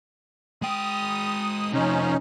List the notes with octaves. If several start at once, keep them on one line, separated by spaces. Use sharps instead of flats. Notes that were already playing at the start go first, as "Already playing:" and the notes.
G#3 G5 D#6
C3 F3 C#4 D#4